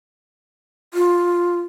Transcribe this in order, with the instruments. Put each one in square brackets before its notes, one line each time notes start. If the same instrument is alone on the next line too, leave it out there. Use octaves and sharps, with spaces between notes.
[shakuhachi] F4